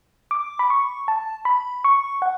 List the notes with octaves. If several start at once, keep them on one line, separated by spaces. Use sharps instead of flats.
D6
B5
C#6
A5
B5
C#6
F#5